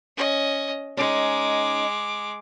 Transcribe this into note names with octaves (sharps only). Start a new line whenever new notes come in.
C#4 D#5
G#3 C#4 D#4 D6